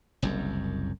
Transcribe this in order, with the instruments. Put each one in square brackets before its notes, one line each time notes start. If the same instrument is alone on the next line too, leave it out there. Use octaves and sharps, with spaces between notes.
[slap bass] F#1 C2 F#2